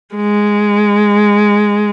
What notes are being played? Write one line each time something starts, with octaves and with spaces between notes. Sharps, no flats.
G#3